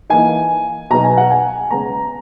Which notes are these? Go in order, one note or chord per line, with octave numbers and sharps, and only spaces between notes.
E3 A#3 D#4 G#5
B2 F#3 B3 D#4 A#5
G#5
F#5
G#5
C#3 G#3 B3 A#5